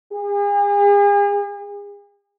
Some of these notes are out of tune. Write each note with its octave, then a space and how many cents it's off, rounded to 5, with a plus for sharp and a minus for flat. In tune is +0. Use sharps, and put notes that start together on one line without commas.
G#4 -40